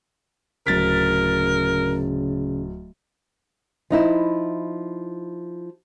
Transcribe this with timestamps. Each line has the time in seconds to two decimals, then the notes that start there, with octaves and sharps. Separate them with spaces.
0.67 D1 C#3 A#4 A6 B6
3.90 F3 D#4 E4